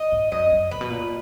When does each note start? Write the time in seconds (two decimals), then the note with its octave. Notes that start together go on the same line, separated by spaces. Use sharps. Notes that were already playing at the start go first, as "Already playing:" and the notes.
Already playing: D#5
0.12 G#2
0.32 F#2 D#5
0.52 F#2
0.71 A#2 B4
0.81 B2
0.90 A#2